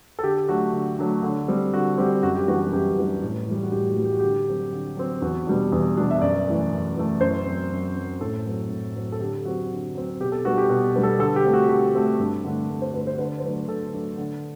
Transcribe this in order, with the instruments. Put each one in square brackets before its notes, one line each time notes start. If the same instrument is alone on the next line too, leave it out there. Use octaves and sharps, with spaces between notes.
[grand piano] A4
D3 G4
F#3 A3 D4 F#4
D3
F#3 A3 D4
D3
G3 C4
D3 F#4
G3 C4 G4
F#2 F#4
G4
E3 G3 B3 D4 F#4
F#4
F#2 G4
E3 G3 B3 D4
A2
E3 G3
F#4
A2 G4
F#4
E3 G3
G4
F#4
D3 G4
F#3 C4
D3
F#3 C4
E2 F#4
B2 G3 D4
E2
B2 G3 D4
E5
F#2 D5
E3 A3
F#2
E3 A3
F#2 C5
C4
F#3
F#2
F#3 C4
A2 A4
F#3 C4
A2
F#3 C4
A4
D3 G4
F#3 C4 F#4
D3
F#3 C4
B2 G4
A4
G3 B3 D4 F#4
G4
B2 F#4
G3 B3 D4
A4
D3 A4
G4
A3 C4
F#4
D3 G4
A3 C4
G2
D3 A3 D4
G2
C5
D3 A3 D4 B4
C5
D3 B4
C5
F#3 A3 D4 B4
D3 A4
F#3 A3 D4
D3